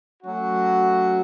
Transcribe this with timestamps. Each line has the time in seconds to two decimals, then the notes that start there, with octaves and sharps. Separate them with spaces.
0.22 F#3 A3 C#4 F#4